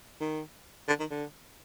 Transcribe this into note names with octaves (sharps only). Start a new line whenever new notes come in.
D#3
D3
D#3
D3